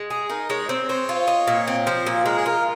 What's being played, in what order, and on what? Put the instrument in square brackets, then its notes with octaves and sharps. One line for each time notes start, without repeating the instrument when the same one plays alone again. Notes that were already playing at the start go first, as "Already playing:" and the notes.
Already playing: [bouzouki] G#3
G#4
[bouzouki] D#4 [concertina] A#4
[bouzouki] G#3 [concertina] C#5
[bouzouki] C4 [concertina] C5
[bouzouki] C5 [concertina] C#5
[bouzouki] F4
D#5
A#2
C4
[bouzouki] F3 [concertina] C5
[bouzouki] A#2
[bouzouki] G#3 [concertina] A#4
[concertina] G#4
[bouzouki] F4 [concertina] A#4